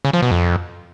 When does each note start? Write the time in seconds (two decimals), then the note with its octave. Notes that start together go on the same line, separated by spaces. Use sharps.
0.05 C#3
0.13 F3
0.22 B2
0.31 F2